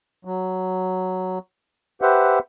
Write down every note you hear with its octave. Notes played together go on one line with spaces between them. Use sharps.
F#3
G4 B4 C5 E5 F#5